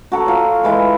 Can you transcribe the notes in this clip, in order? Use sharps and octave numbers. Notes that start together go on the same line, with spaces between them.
F#4 A4 A#5
F4 C#5
E3 G#3 E4